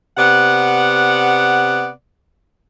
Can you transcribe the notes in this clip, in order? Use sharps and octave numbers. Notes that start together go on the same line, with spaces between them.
C3 B3 D5 F#5